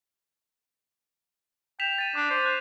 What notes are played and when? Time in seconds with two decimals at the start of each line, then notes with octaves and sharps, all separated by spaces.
1.80 G5 B6 E7 F7
1.98 A6 D#7
2.15 D4 D6
2.30 C5
2.46 F#6